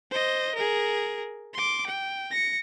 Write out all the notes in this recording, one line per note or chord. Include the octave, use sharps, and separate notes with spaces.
C5 D#5
G#4 A#4
C6 D6
G5
A#6 C#7